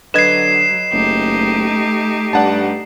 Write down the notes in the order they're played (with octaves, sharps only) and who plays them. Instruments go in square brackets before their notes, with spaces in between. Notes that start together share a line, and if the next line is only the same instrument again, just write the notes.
[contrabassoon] D3 [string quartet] F#3 [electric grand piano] B4 D#5 G#6 [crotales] C7 E7
[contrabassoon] F#1 [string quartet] A3 D#4 G4
[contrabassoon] G2 [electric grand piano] D5 F#5 A5